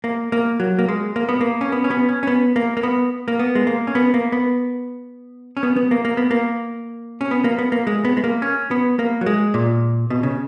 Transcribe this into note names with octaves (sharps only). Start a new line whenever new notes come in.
A#3
A#3
F#3
A#3
G#3
A#3
B3
A#3
C#4
B3
C#4
B3
C#4
C#4
B3
A#3
A#3
B3
A#3
B3
G#3
A#3
C#4
B3
A#3
B3
C#4
B3
B3
A#3
A#3
B3
A#3
C#4
B3
A#3
B3
A#3
G#3
B3
G#3
A#3
C#4
B3
A#3
F#3
G#3
A#2
B2
C#3